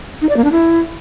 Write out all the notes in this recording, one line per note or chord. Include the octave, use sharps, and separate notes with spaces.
D#4
D5
A#3
D4
E4